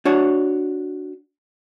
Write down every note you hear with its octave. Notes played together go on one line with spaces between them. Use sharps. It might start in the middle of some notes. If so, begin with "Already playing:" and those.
D4 F#4 C#5